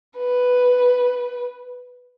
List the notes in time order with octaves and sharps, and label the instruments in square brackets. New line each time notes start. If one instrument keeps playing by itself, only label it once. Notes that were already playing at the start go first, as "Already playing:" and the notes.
[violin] B4